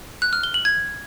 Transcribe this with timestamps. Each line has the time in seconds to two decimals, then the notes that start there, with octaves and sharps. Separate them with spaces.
0.22 F#6
0.33 F6
0.43 G7
0.54 F#7
0.65 G#6